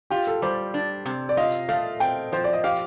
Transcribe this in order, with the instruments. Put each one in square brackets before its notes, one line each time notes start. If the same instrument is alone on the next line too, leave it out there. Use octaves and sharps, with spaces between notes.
[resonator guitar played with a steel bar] F4 [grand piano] G4
[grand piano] A4
[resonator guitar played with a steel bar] G3 [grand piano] C5
[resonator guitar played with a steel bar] D4
C3
[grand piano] D5
[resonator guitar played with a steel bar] F4 [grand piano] D#5
[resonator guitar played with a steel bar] A3 [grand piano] F5
[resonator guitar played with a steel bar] C4 [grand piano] G5
[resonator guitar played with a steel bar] F3 [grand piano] C5
[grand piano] D5
D#5
[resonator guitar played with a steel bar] G4 [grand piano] F5